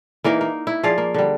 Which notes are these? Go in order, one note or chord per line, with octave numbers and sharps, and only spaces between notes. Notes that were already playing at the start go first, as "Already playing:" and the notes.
E3 A#3 D#4 A#4
A#3
E4
F3 G#4 D5 F5
A#3
D3 G3